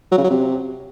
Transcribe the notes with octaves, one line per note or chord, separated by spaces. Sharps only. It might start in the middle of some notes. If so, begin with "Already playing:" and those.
F#3
C#3
F#3
C3